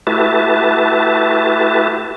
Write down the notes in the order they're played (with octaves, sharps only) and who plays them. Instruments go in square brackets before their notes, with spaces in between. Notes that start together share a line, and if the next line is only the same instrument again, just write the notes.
[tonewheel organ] A3 E4 F#4 G4 B4 A5